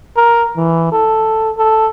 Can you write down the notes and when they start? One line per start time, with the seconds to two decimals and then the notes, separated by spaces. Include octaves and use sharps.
0.16 A#4
0.57 E3
0.92 A4
1.58 A4